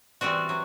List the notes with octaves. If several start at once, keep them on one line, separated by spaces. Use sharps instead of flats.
E3 G3 C4 F#4
F#3